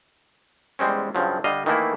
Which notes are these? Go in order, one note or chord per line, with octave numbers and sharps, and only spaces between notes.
E2 G3 G#3 C4 C#4
G2 C#3 F3 F#3
D3 G3 D#5 F5
D#3 E3 A3 A#3 E4